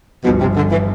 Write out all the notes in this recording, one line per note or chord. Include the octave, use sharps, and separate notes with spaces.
G1 G2 B2 F3
C3
D3
E3